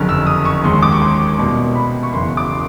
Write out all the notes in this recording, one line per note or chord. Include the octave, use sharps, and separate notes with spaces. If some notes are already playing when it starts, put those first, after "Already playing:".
Already playing: F#1 F2 D3 F6
E6
D#6
C#6
D#2 D#3 G#3 C6
D6
C#6
C6
C2 B2 G3 A#3
B5
C#6
F#1 E2 C#3 C6
D6